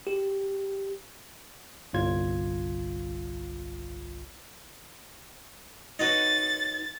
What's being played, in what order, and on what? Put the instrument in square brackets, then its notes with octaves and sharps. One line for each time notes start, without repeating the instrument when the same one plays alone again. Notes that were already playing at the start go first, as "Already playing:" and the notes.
[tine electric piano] G4
G1 C2 F4 G#6
[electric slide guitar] D#4 B4 C#5 [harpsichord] F#4 D#5 [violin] A6